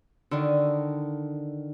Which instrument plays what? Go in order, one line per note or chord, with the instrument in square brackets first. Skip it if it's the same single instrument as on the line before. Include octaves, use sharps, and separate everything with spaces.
[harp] D3 D#3